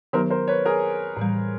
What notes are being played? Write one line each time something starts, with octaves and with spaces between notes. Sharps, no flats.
D#3 F#3 B3 D#4 G4 A#4 C5
A#4 C5
B4 C#5
G#4 A#4
A2 E3 G3